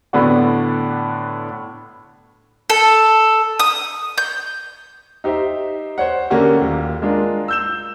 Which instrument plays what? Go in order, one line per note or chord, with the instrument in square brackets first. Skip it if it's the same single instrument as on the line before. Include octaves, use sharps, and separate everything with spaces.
[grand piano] A2 D3 B3 D4 F#4
[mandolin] A4
D#6
G6
[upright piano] D#4 G4 C5 E5
C5 C#5 F#5
D3 A3 A#3 C#4 F#4 G4
D#1 D#2
G#3 D4 F4 A#4
E6 G6 E7